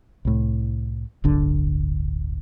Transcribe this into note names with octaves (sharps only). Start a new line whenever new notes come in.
C2 A2
D1 G1 D3 D4